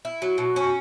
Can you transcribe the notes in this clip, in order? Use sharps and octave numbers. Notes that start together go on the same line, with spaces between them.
E4
F#3
B2
C#4